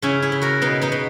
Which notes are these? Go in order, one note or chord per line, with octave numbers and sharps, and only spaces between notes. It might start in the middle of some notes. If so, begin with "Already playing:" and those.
C#3 C#4 E4
E4 G#4
C#3
F#4 A#4
B2 B3 D#4
B3 D#4
B2